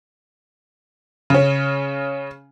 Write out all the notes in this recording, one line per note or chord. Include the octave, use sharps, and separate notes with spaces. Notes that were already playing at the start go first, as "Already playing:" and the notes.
C#3 C#4